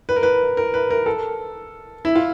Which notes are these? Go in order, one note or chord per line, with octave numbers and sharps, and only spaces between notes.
B4
A#4
B4
A#4
B4
A#4
A4
E4
F4